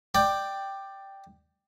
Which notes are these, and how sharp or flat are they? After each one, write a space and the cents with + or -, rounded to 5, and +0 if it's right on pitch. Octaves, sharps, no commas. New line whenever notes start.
D5 +15 G5 +0